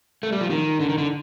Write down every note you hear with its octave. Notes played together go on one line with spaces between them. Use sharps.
A3
G3
F3
D#3
D3
D#3
D3